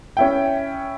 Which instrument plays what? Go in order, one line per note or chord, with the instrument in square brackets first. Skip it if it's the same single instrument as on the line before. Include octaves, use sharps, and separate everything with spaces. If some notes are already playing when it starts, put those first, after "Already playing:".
[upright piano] C#4 E4 G5